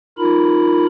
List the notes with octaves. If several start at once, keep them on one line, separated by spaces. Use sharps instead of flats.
D#4 F4 A#4 B5